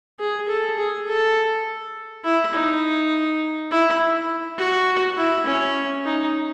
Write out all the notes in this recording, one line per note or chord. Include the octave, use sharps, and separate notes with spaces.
G#4
A4
G#4
A4
E4
D#4
E4
F#4
E4
C#4
D#4